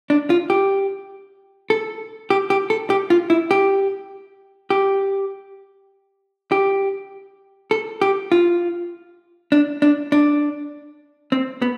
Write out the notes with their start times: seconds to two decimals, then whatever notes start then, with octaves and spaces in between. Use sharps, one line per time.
0.10 D4
0.30 F4
0.50 G4
1.70 A4
2.30 G4
2.50 G4
2.70 A4
2.90 G4
3.10 F4
3.30 E4
3.51 G4
4.70 G4
6.52 G4
7.71 A4
8.02 G4
8.32 F4
9.52 D4
9.82 D4
10.12 D4
11.32 C4
11.62 B3